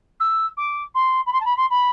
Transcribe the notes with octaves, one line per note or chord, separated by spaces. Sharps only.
E6
D6
C6
B5
C6
A5
B5
C6
B5